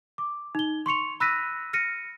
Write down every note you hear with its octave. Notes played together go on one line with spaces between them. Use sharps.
D6
D#4 G7
C6 C#6 C#7 F7
B5 E6 F#6 A#6 B6 D#7
F6 A#6 C#7 D#7